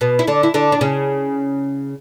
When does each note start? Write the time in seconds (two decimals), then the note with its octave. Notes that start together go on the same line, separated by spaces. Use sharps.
0.01 B2 B3
0.19 E4
0.27 D3 D4
0.43 E4
0.54 D3 D4
0.72 D4
0.81 C#3 C#4